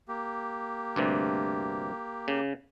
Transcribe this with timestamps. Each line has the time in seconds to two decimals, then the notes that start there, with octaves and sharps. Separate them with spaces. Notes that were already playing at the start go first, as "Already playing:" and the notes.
0.08 A#3 G4
0.96 D2 G2 C3
2.28 C#3